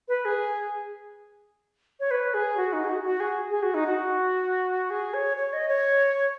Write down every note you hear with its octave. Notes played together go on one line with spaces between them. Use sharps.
B4
G#4
C#5
B4
G#4
F#4
D#4
G#4
F#4
F#4
G#4
G#4
F#4
D#4
F#4
G#4
C#5
C#5
D#5
C#5